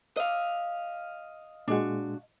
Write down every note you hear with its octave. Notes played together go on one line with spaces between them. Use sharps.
D#5 F5
A#2 G#3 D4 F#4